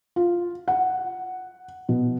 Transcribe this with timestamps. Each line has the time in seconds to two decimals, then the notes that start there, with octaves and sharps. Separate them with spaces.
0.16 F4
0.68 F#5
1.89 B2